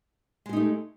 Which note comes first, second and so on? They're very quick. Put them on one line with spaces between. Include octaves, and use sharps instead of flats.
G#3 G4 D#4 A3